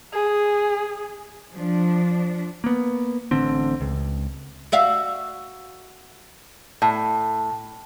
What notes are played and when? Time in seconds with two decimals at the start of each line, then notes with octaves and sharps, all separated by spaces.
0.13 G#4
1.54 F3 D4
2.64 A#3 B3
3.31 A1 D3 C4
3.81 C#2
4.72 F#4 E5 F5
6.82 A2